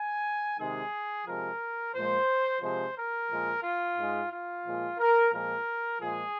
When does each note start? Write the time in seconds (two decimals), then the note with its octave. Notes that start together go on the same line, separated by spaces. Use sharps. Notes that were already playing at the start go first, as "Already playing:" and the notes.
Already playing: G#5
0.59 C3 D#3 G#3 G#4
1.26 C3 F3 G#3 A#4
1.94 A#2 F3 G#3 C5
2.61 C3 F3 G#3 C5
2.96 A#4
3.30 A#2 F3 G#3
3.63 F4
3.97 G#2 G#3
4.31 F4
4.65 A#2 F3 G#3
4.98 A#4
5.33 A#2 F3 G#3 A#4
6.00 A#2 F3 G#3 G#4